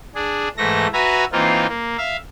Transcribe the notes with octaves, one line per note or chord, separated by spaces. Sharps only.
D4 G#4
G#2 E3 A3 A4 A#6
F#4 B4 E5 G#5 A#5
E3 A#3 C4 D#4 F4
A#3
E5 F5